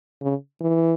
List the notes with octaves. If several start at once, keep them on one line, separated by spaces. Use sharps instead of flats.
C#3
E3